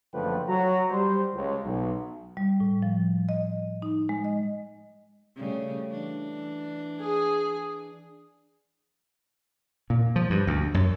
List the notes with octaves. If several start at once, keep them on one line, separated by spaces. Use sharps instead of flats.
F#1 D3 F3 A3 B4 G5
F#3 F#4 A#5
G3 C5
C#2
B1
G3
A2
F3
D#5
D#4
G#3
D#5
C#3 G3 A3
E3 D4
G#4
A#2
F3
G2
D2
F#2